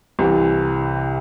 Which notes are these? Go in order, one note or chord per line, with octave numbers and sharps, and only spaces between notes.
C2 C3 E3